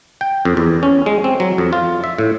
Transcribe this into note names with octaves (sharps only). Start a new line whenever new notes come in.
G5
F2
E2
C#4
G#3
C4
F#3
F2
F4
E5
A2